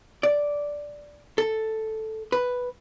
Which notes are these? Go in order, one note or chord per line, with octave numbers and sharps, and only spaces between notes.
D5
A4
B4